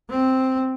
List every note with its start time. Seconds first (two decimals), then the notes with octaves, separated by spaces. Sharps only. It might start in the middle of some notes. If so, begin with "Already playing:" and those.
0.10 C4